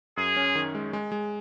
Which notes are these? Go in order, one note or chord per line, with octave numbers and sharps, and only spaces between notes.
F#2 G#4
C#4
D#3
G#3
G#3
G#3